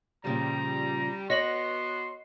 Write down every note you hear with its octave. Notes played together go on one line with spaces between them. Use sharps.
A#2 C#3 F3 G3 A#5
B3 F#4 C#5 D#5 C6 A#6 F#7